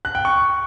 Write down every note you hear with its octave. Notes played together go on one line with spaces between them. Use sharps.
F#6
G5
C#6